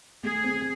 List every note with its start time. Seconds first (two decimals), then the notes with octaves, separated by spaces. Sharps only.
0.23 A3 G#4
0.44 C4